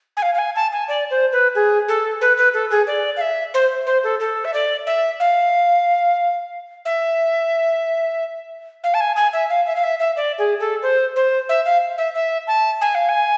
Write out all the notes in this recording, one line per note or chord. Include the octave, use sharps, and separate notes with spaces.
G#5
F5
F5
G#5
A5
G#5
D5
C5
B4
G#4
A4
B4
B4
A4
G#4
D5
F5
E5
C5
C5
A4
A4
E5
D5
E5
F5
E5
F5
A5
G#5
G#5
E5
F5
E5
F5
E5
E5
D5
G#4
A4
C5
C5
E5
F5
E5
E5
A5
G#5
F5
G#5